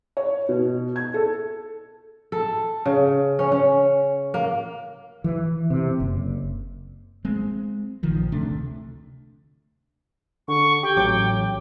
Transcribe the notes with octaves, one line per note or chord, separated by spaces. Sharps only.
C#5
B2
G#6
A4
A4
C#3
C#4
C#4
A#3
E3
C3
F#1
G#3 C4
A#1 D#3 F3
D2 C3 A3 D4
D3 C#6
G4 G5
A1 F#3 D6